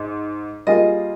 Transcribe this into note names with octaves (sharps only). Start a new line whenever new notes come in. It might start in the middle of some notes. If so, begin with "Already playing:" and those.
Already playing: G#2
G3 A#3 F4 G#4 D#5